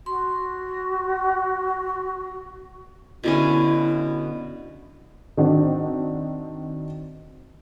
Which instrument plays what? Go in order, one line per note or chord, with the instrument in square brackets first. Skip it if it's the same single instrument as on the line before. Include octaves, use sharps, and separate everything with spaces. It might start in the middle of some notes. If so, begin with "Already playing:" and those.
[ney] F#4 [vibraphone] C6
[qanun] B2 D3 C#4 [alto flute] E4
[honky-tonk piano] D#3 C4 D4 F#4